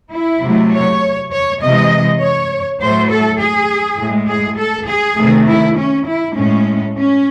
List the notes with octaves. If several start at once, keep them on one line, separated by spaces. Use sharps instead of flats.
E4
C3 F#3 A3
C#5
C#5
C3 E3 G#3 D#5
C#5
A2 F#3 A3 C5
A4
G#4
A2 G#3
G#4
A4
G#4
C3 D#3 A3
E4
C#4
E4
A2 G#3 C#4
C#4